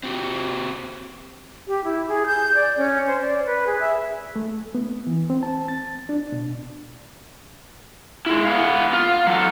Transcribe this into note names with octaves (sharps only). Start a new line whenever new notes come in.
C4 F#4 G4
G4
E4
G#4
G6
D5
C#4
C5
D5
B4
G#4
E5
A3
B3
E3
C4
A5
A6
D4
B2
G#3 E4
B3 F5
F4
F#3 A4